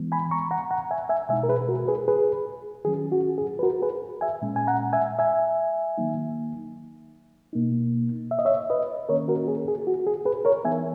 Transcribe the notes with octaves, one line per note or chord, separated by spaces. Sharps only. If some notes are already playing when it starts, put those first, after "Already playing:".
Already playing: E3 G#3 B3
G#5 B5
A#5 C#6
F#5 A#5
F#5 A#5
E5 G#5
E5 G#5
B2 G#3 D#4 E5 G#5
A#4
G#4 B4
F#4 A#4
G#4 B4
G#4 B4
D#3 F#3 C#4 G#4
F#4
G#4
B4
F#4 A#4
G#4 B4
E5 G#5
A#2 G#3 C#4
G#5
F#5 A#5
E5 G#5
E5 G#5
D#3 F#3 A#3 D#4
B2 A#3 D#4
E5
D#5
C#5 E5
B4 D#5
D#3 A#3 C#4 A#4 C#5
F#4 A#4
G#4
G#4
F#4
G#4
G#4 B4
A#4 C#5
E3 B3 D#4 E5 G#5